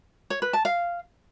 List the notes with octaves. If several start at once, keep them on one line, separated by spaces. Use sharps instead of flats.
C#5
B4
A5
F5